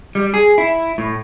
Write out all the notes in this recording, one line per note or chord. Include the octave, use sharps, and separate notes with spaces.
G3
G#4
E4
A2